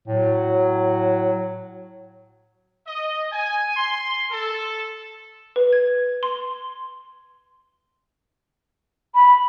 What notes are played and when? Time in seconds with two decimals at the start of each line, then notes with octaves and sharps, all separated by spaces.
0.08 A2 F#3
2.88 D#5
3.32 G#5
3.77 C6
4.31 A4
5.56 B4
5.73 G#6
6.23 C6
9.15 B5